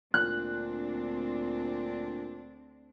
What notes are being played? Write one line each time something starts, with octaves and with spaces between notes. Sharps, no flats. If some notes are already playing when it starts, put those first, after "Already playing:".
D2 A#2 C4 D4 F#6